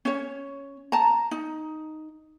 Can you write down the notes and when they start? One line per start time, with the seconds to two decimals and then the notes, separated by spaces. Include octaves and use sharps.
0.05 C#4 C#5
0.92 A5 A#5
1.31 D#4